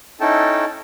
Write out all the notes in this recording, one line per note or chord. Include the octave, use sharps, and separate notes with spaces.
C#4 D#4 E4 A4 G5 A5